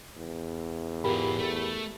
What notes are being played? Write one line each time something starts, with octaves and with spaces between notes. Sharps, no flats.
E2
G#2 F4 G4 A#4 B5
A3